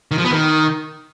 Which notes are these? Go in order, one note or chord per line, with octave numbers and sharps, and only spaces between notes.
D#3
F3
B3
D#3